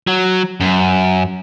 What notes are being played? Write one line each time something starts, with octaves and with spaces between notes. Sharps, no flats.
F#3
F#2